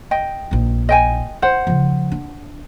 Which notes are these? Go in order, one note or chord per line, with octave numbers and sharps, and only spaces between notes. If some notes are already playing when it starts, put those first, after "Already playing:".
D#5 G5
A#1 D#4
D#5 G5 G#5
E4 C5 F#5
C#3 F3
D4